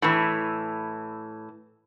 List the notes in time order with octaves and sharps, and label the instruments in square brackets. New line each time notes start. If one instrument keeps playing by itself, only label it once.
[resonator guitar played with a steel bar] A2 E3